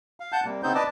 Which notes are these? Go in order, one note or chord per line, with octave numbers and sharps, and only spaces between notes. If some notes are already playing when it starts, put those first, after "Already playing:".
F5
F#5 A5 G6
C3 G3 A#3
C#3 B3 C4 D#4 C5 G6
B4 D5 D#5 A5 D6